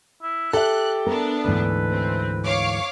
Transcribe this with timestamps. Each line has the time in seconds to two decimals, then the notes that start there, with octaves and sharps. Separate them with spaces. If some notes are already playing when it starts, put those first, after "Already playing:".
0.23 E4
0.53 G4 A4 E5 F#6
1.07 B3 D4 A#4
1.44 D2 G#2 E3 B4
1.90 C4
2.45 C#5 F5 D6